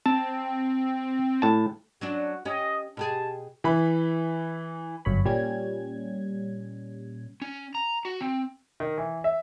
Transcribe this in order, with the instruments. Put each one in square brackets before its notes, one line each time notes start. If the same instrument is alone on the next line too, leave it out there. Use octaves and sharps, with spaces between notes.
[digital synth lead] C4 [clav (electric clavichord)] A5
[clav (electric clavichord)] A2 A5
[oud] F#3 C#4 D4 [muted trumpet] F#4
[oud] C#4 G4 [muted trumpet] D#5
[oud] B2 G4 G#4 [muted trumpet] A5
[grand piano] E3 B5
[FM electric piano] G1 F#2 C#5 B5
A#2 G3 C#4 G#6
[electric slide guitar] C#4
A#5
F#4
C4
[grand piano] D#3
E3
E5